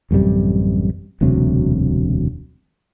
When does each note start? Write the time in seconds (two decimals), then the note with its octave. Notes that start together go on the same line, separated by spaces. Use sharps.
0.11 A1 F#2 C3 G3
1.21 E1 D2 C3 F#3